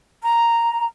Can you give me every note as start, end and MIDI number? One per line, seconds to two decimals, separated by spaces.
0.22 0.85 82